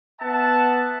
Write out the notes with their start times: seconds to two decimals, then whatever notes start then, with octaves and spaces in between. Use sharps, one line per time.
0.21 B3 E5 F#5 A5